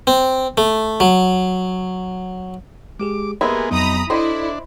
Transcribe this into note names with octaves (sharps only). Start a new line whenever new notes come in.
C4
A3
F#3
G#3 G4 G#4 D6
G#3 A#3 B3 E4 G4 G#4
F2 F#3 B3 D#4 A#5 B5 D#6
D4 E4 A4 C5 D5 D#5